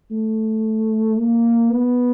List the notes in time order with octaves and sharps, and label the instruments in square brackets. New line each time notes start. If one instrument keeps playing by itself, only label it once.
[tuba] A3
A#3
B3